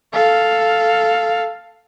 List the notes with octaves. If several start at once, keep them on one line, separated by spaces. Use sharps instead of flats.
A4 F5